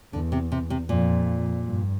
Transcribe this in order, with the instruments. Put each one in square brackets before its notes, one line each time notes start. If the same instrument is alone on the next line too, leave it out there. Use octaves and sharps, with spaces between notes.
[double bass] E2 [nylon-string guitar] D3
[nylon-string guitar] C3
C3
C3
[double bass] F2 [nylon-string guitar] A#2
[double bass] G2